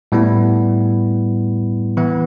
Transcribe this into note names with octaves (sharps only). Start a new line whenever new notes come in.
A2 G3 B3 E4
E3 B3 E4